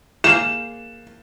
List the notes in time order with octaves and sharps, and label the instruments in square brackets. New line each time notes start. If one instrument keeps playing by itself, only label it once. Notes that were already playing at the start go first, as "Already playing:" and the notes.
[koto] A#3 G#4 C5 [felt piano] E7